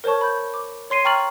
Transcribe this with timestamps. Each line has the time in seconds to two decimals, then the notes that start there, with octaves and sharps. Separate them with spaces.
0.04 A#4 C5 C#5 A5 C#6
0.21 B5 G6
0.54 D6
0.90 C#5 C6 C7 D#7
1.05 G5 A#5 C#6 F6 A6 F#7